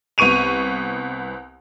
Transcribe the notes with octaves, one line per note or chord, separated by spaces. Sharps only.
C2 B3 C#6 D#7 F7